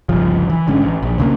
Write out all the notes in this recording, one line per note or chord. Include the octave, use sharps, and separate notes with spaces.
G1 C#2 F3
E3
G#1 D3 G#3 C#4
A1
A#1
D2 C#3 F3 A#3